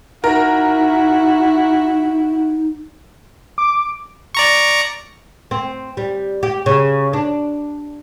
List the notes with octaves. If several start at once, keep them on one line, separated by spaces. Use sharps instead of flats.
D#4 E4 F#4 A#4
D6
D5 A#5 C#6
C4
G3
G4
C#3
D4